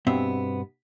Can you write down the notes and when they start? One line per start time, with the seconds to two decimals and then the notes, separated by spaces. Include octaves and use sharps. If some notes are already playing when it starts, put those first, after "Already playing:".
0.07 G2 B2 B3 C4 E5